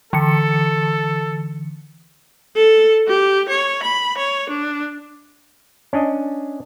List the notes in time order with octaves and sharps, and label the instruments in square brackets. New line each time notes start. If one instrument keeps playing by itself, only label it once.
[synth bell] D3 E3 C#7 [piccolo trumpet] A4
[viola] A4
G4
C#5
B5
C#5
D4
[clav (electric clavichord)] C#4 D4 D#5